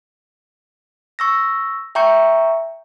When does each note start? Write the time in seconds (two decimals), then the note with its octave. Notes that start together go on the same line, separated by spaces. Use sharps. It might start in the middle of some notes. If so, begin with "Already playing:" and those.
1.19 C#6 E6 A#6
1.95 E5 G5 A#5 C#6 G6 C#7